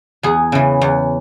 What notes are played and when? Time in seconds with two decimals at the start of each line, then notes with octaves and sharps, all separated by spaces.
0.23 E2 G#4
0.52 C#3 E3
0.82 E2